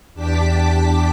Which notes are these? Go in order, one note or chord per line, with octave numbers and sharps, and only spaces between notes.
E2 D4 G4 A5 D6 B6